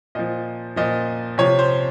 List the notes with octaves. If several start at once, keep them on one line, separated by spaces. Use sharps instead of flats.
A#2 F3 D#5
A#2 F3 D#5
C3 F3 C#5
C5